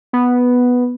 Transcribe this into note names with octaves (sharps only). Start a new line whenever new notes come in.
B3